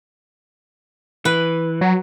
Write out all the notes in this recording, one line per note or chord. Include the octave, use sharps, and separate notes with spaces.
E3 B4
F#3